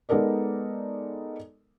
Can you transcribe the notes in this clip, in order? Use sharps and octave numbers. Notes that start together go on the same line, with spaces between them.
G#3 B3 D#4 A4 A#4 D5